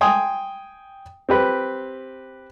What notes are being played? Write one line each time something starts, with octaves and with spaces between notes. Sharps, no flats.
G5 G#5 C6 D#6
C4 G4 B4